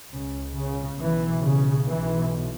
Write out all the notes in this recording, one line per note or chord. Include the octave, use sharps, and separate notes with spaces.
C#2 C#3
C#3
B1 B2 E3
C#3
B1 B2 E3